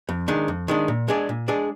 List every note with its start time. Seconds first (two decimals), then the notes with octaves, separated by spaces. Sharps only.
0.09 F2
0.28 D#3 G#3 D4
0.48 F2
0.68 D#3 G#3 D4
0.88 A#2
1.08 G#3 D4 G#4 D5
1.29 A#2
1.48 G#3 D4 G#4 D5